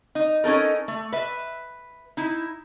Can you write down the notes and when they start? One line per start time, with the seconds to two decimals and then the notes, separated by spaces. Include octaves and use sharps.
0.15 D#4
0.44 C#4 D#4 A4 A#4
0.88 A3
1.12 B4 E5
2.17 D#4 E4